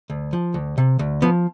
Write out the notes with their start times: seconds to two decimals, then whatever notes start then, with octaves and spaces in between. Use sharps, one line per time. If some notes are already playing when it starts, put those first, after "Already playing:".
0.10 D2
0.33 F3
0.54 D2
0.78 C3
0.99 D2
1.22 F3 B3